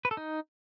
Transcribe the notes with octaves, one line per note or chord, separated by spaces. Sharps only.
B4
A4
D#4